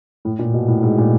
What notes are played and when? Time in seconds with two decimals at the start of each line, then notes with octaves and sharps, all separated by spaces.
0.25 A2
0.39 A#2
0.54 B2
0.68 A2
0.83 G#2
0.98 A#2